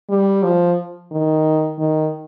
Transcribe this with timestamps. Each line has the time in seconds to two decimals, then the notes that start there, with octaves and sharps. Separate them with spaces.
0.10 G3
0.43 F3
1.11 D#3
1.78 D#3